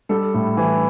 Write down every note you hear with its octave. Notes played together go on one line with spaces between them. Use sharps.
G3 A4
A2
E3